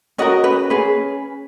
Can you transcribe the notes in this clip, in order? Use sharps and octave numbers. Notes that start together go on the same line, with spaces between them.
C#4 F#4 A#4 D#5
B4
C#4 G#4 B4